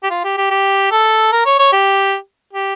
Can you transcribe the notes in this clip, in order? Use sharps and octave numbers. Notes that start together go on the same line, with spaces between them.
G4
F4
G4
G4
G4
A4
A#4
C#5
C#5
G4
G4